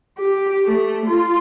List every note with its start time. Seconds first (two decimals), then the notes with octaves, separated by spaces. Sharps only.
0.18 G4
0.65 A3
1.06 F4